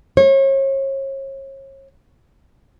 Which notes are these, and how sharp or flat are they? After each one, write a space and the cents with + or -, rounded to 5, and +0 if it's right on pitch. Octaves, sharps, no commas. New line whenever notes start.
C#5 -35